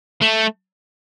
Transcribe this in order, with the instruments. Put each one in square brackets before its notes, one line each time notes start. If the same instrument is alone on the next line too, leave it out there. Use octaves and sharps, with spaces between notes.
[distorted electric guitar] A3